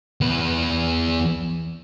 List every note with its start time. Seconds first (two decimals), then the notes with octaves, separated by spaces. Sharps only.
0.21 E2 B4